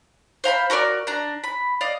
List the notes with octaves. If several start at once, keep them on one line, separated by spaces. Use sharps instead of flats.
C5 F5 A#5 B5
F#4 A4 A#4 D5
D4 A#5
B5
D5 D#5 F5